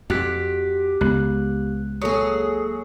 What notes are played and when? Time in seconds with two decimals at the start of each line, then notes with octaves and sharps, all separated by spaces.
0.10 F2 F#4 G4 F#6 B6
1.01 C#2 B3 F#6
2.02 F#3 A#3 G#4 A4 D#6